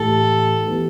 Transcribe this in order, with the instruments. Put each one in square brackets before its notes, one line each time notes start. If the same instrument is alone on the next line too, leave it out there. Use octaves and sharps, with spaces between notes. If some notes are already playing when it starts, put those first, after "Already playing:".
Already playing: [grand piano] A2 E3 A3 G4 [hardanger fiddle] A4
[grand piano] E3 B3 G4